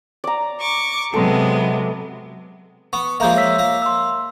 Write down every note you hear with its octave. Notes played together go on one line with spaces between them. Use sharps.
D5 A#5
C#6 D6
C3 F#3 G#3 B3 A4
B3 C#6
F3 G#3 A#3 E5 A#5 G6
C#5 E6 B6
A#3
C6 E6